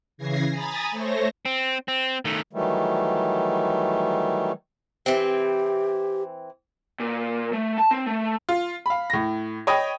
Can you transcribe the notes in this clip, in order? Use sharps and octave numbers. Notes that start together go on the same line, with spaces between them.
C#3 E3 G#6 A#6 C7
G#5 A#5 B5 D#6 A6
A3 C5 C#5 A#6
C4
C4
D#3 A3
D#3 E3 F#3 G3 A3
E3 C4 G4
A#2
A3
A5
C4
A3
F4
F5 B5
A2 A#6
C#5 D#5 G5 B5 D#6